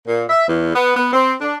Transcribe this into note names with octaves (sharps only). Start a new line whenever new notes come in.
A#2
E5
E2
B3
B3
C4
D4